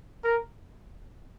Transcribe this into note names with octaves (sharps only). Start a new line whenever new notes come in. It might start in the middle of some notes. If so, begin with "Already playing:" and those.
A#4